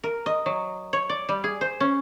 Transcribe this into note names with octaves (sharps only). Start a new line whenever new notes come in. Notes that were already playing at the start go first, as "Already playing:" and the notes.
A#4
D#5
F#3
C#5
D5
G3
G#4
C5
C#4